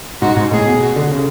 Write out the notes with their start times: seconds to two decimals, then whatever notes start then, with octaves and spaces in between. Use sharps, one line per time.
0.22 G#2 F#4
0.37 G#2
0.51 A2 G#4
0.66 B2
0.81 F#4
0.96 D3
1.11 C#3